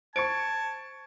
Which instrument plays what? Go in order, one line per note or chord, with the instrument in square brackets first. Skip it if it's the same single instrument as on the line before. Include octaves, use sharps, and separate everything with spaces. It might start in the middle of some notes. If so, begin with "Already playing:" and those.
[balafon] C5 [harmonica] A5 [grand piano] C#6 C#7 D7 [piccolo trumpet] G#6